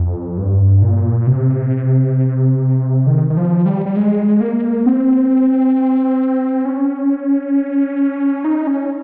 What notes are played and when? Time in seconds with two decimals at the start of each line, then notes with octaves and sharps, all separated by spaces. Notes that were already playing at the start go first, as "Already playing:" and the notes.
Already playing: F2
0.38 G2
0.82 A#2
1.27 C3
3.07 D#3
3.30 D#3
3.37 F3
3.66 G3
3.86 G3
3.96 G#3
4.40 A#3
4.86 C4
6.65 C#4
8.45 D#4
8.67 C#4